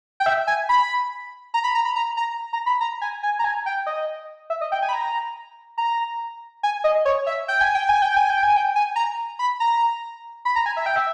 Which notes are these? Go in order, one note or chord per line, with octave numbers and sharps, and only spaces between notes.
G5
E5
G#5
B5
A#5
B5
A#5
B5
A#5
A#5
A#5
B5
A#5
G#5
G#5
A#5
G#5
G5
D#5
E5
D#5
G5
G#5
B5
A#5
A#5
G#5
D#5
C#5
E5
G5
G#5
G5
G#5
G5
G#5
G5
G#5
G5
G#5
A#5
B5
A#5
B5
A#5
G#5
E5
G5
E5